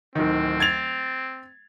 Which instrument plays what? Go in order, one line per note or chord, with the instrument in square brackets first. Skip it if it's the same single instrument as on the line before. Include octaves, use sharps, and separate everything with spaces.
[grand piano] D1 D#3 [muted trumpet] C4
[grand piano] G#6 A6 F7